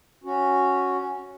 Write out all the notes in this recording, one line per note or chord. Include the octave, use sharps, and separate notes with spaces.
C#4 F#4